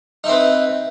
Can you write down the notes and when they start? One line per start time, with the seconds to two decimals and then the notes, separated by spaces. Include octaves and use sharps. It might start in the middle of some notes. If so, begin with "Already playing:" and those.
0.24 D#4
0.27 E4
0.29 C4
0.32 B4